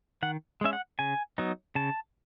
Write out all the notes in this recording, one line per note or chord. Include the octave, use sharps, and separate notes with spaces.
D#3 F#5
G#3 C#4 E5
F#5
C#3 G#5
F#3 B3 D#4
C#3 A5